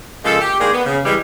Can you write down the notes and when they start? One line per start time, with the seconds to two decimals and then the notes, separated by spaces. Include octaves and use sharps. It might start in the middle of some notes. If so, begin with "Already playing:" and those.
0.25 C#3 F3 G#3 A#3 A4
0.41 G4
0.60 D#3 G#3 A#3 D4 G#4 D5
0.73 B3
0.86 C#3
1.05 E3 G3 G#3